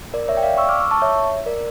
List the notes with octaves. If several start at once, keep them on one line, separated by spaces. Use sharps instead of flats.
A#4 D5
C#5 E5
G5
D5 F5
C#6 E6
D6 F6
C#6 E6
A5 C#6
C#5 E5
A#4 D5